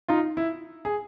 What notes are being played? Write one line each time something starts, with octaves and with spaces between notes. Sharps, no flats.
D#4 F4
E4
G#4